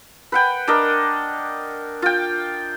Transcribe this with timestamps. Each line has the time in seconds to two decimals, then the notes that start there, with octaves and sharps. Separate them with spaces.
0.32 B4 F#5 G5
0.68 D4 A#4 D#5
2.02 F4 G5